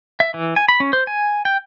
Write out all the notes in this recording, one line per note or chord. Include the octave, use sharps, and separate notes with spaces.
E5
E3
G#5
B5
C#4
C5
G#5
G5